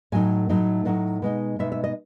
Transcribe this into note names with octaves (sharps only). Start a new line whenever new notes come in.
A2 F#3 A3 D#4 G#5
A2 F#3 A3 D#4
A2 F#3 A3 D#4 F#5
B2 G#3 D#4
B2 G#3 D#4 E5
E5
D#5